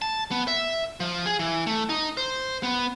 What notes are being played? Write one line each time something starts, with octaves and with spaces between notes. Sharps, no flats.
A5
B3
E5
F3
G#4
E3
A3
D#4
C5
B3